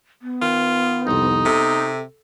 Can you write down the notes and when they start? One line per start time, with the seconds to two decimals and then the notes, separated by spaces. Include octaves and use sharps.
0.22 B3
0.42 D#3 F4
1.07 C2 F2 D#4
1.45 C3 A4